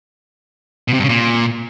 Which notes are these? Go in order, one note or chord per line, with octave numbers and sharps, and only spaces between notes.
B2
C3
G2
C#3
A#2